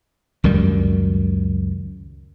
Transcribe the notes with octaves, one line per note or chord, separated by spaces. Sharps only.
C#2 F#2 D#3 G3